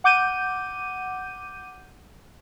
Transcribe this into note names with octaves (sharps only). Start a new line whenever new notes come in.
F#5 D6 G6 D#7